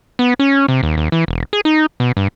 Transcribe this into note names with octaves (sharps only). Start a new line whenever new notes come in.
B3
C#4
C3
D#2
D#2
E3
E1
G#4
D#4
B2
G2